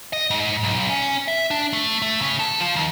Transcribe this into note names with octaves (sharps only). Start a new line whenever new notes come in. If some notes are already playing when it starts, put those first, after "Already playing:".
D#5
G#2
B1
C#4
E5
D4
A3
A3
C#3
A4
F3
D#2